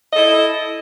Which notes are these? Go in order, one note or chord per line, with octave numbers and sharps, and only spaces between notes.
E4 A4 D#5